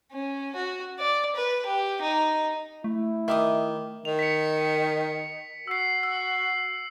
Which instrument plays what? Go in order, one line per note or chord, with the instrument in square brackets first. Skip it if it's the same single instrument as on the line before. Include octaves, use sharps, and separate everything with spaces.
[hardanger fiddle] C#4
F#4
D5
B4
G4
D#4
[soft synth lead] A3 [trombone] E4
[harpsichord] D#3 [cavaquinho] E5 D6 D#6
[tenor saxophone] D#3 [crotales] F7
[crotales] B6 C#7
[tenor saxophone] F#4 [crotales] E6 C7
[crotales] E6